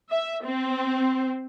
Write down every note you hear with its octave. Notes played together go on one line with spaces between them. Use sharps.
E5
C4